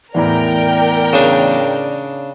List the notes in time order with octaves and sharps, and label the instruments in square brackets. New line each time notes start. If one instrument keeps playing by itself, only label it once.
[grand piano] E2 A2 A#5 [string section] A#4 G5 [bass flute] D5
[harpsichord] C#3 D4